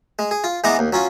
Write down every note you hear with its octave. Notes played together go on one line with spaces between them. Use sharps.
G#3
G#4
F4
E3 G#3 B3 F#5 A#5 D6
D#2
F#3 C#4 F4